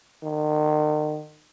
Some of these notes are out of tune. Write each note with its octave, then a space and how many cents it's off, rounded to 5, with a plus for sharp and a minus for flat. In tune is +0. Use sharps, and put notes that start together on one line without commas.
D#3 -40